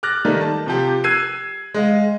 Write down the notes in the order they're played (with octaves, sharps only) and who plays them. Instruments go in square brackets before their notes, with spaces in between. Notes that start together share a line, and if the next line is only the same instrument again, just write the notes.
[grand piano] D6 F6 F#6 A6 A#6
D#3 G3 A3 A#3 D#4
A5
C3 F3 G4
E6 F#6 G#6 C7 D#7
G#3 D#5 F5